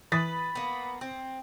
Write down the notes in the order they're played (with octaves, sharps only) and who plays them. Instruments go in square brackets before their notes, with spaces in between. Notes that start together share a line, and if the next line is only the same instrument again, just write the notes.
[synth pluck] E3 [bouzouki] B4 [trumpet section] B5 [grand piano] D#6 A6 B6
[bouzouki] A#3 B3
C4